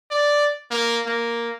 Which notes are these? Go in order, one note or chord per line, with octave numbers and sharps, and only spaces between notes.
D5
A#3
A#3